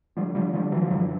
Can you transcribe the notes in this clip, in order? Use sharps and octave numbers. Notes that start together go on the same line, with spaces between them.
D3 F3 G3
D3 F3 G3
D3 F3 G3
D3 E3 F#3
F3
F#2 E3 F#3